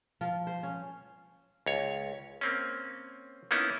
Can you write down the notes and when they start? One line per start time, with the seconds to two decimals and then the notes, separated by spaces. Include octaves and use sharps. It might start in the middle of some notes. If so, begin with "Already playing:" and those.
0.21 F3 F4
0.47 C5
0.63 C#4
1.66 C#2 C#5
2.41 A#3 C4 C#4
3.51 A#3 B3 C#4 D#4 E4